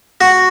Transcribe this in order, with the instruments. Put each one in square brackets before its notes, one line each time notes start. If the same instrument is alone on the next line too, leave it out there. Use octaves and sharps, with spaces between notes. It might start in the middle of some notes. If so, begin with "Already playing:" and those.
[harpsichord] F#4